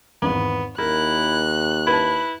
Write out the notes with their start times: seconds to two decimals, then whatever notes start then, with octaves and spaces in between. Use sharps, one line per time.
0.22 G#1 E2 B3
0.79 D#2 E4 A#4 F#6
1.87 E4 B4 A5